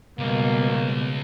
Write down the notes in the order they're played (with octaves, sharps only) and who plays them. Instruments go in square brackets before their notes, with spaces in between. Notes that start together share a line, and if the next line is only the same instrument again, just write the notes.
[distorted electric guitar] C#2 [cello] B2 G3 [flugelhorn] A#3